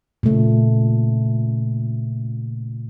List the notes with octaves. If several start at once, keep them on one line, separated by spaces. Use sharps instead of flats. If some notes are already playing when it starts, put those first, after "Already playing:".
A#2 C#3 A3